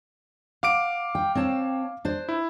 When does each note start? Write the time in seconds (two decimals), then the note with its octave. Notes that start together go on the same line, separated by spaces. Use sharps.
0.63 F5 F#5 D6 D7
1.15 G5
1.35 C4 C#5 A5
2.05 D4 C5
2.29 E4